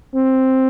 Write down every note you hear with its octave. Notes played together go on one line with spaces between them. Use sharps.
C4